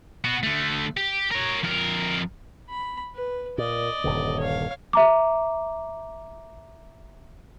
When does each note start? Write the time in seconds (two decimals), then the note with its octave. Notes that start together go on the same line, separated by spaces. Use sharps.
0.24 B3 F#4
0.43 D3 A3
0.97 G4
1.32 A#4 C#5
1.64 F2 A#4
2.70 B5
3.15 B4
3.58 A#2 D5 D#5
4.04 D#1 G2 D3
4.39 C#5 F5
4.93 E5 A#5 D6